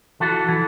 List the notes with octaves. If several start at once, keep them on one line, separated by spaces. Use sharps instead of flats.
E3 F#4 A4
E3